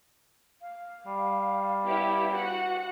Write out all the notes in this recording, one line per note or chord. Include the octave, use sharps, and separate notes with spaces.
F5
G3
B3 E4 G4
F#4 F#5